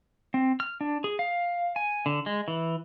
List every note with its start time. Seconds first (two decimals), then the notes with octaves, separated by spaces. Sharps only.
0.34 C4
0.60 F6
0.81 D4
1.04 G#4
1.19 F5
1.76 G#5
2.06 D3
2.26 G#3
2.48 E3